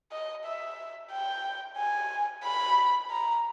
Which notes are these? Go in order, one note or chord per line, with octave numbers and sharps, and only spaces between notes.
D#5
E5
G5
G#5
B5
A#5